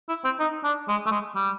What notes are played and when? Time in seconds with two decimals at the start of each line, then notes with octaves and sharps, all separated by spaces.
0.09 E4
0.24 C4
0.40 D#4
0.64 D4
0.88 G#3
1.06 A3
1.11 G#3
1.35 G3